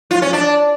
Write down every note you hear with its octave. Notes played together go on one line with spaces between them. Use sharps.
F4
C#4
D4